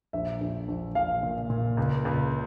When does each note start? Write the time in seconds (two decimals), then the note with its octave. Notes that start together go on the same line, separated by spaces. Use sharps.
0.13 A#1 E5
0.41 A#1
0.68 A#1
0.95 A#1 F5
1.23 A#2
1.50 A#2
1.77 C#2
2.05 C#2